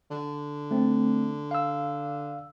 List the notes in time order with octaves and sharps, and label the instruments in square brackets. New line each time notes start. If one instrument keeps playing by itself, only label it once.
[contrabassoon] D3
[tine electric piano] A3 C4
F5 E6